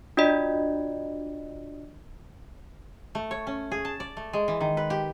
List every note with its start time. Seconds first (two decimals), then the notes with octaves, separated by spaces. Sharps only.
0.17 D4 F4 F#4 D5 D#5
3.15 A3
3.31 C#5
3.47 C#4
3.71 G#4
3.85 A5
4.00 D5
4.17 A3
4.33 G#3
4.48 E3
4.61 D#3
4.77 B4
4.90 G4